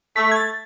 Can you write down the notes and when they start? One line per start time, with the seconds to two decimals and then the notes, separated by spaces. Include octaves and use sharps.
0.16 A3 B6
0.32 G#6
0.36 A6